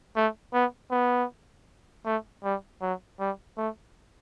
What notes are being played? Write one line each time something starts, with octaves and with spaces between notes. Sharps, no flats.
A3
B3
B3
A3
G3
F#3
G3
A3